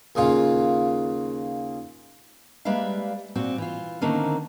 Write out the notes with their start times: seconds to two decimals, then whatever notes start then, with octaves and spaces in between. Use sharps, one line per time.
0.15 D#2 C#3 F4
2.65 G3 G#3 A#3 B4 E5 F5
3.35 A#2 C4 F#4
3.58 E3 F4
4.01 D3 D#3 A3 A#3 C4 C#4